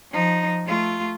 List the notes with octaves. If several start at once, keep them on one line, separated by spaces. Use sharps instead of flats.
F3 D#4
A3 F4